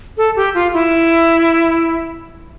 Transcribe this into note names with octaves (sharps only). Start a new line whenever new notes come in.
A4
G4
F4
E4